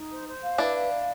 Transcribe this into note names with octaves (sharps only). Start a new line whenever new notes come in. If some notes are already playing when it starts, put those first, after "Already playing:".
Already playing: D#4
C5
C5
F5
D4 E4 B4
F5
D5